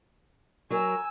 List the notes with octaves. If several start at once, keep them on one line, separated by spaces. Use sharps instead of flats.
F#3 A#4 G#5 E6